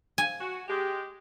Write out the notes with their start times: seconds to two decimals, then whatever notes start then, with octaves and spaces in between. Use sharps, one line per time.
0.18 G#5
0.40 F#4
0.68 G#3 G4